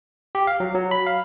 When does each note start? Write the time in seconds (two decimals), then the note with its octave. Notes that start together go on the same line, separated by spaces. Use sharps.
0.35 G4
0.47 F5
0.60 F#3
0.75 F#3
0.91 B5
1.07 F5